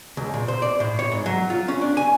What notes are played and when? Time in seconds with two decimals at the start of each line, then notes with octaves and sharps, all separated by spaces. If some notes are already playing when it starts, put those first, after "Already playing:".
0.17 C#2
0.34 A#2
0.48 C5
0.62 D5
0.80 A2
0.99 C#5
1.12 G#2
1.26 F#3
1.50 F4
1.68 C#4
1.81 D4
1.97 G#5